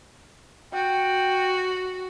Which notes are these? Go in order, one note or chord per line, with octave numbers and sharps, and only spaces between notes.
F#4 G5